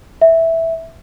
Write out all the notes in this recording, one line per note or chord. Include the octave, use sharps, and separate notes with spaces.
E5